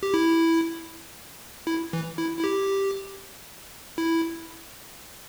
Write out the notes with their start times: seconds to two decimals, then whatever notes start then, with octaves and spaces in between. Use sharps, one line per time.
0.03 G4
0.14 E4
1.67 E4
1.93 E3
2.18 E4
2.39 E4
2.44 G4
3.98 E4